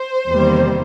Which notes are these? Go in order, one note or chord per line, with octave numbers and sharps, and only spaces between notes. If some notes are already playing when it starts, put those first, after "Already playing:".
Already playing: C5
E2 C3 D#3 G3 A#3